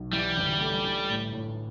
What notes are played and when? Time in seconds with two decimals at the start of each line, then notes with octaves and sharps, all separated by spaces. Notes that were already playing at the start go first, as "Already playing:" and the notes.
Already playing: B1
0.13 E3 G3
0.38 G1
0.60 A3
0.85 A3
1.09 A2
1.33 A2